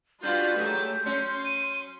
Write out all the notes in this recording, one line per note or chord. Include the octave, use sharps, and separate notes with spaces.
G3 D4 F4 F#4 B4 G6
F#3 A3 G4 G#4
F#3 C#4 C6
D#7